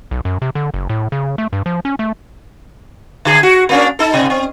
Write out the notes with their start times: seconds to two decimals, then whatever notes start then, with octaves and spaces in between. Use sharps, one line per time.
0.11 B1
0.25 F#2
0.42 C3
0.55 D3
0.74 F#1
0.89 A2
1.12 C#3
1.38 A3
1.53 G2
1.66 F3
1.85 C#4
1.99 A3
3.25 D3 G#4
3.43 F#4
3.69 A#3 C#4 D4
3.99 D#4 A4
4.13 G#2 C3 D#5
4.30 C4